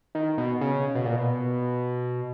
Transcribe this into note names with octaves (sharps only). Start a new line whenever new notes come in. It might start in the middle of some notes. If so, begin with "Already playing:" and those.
D#3
B2
C#3
B2
A#2
B2